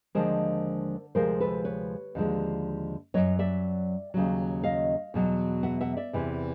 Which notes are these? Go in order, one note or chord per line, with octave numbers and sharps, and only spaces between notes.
D#2 D3 F3 G#3 A#4 C5
D2 C3 F3 G#3 A#4 C5
A4 B4
B4 C#5
D#2 D3 F3 G#3
F#2 D#3 F#3 C#5 D#5
D5 E5
D#2 C#3 F#3
D#5 F5
E2 B2 F#3
E5 F#5
E5 F#5
D5 E5
E2 C3 E3